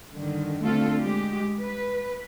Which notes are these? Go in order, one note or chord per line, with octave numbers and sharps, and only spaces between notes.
G2 D3 D#3
D3 A3 C4 F4 A4
G#3 G4
B4